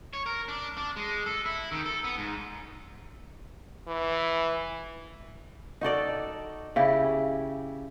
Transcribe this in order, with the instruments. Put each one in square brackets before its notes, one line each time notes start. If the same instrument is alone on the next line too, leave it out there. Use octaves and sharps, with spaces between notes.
[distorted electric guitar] C#5
A#4
D4
D4
G#3
A4
E4
D#3
A4
B3
G#2
[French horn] E3
[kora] D#4 F#4 A4 D5
C#3 E4 G4